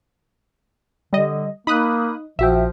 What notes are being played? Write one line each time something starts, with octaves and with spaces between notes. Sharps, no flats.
D3 G3 D#5
A#3 D#4 B5 D#6 F#6
A#1 F3 F#4 E5 G5